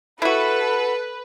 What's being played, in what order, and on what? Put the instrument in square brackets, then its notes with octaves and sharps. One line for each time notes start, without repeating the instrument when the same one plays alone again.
[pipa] E4 F#4 [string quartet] A4 [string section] B4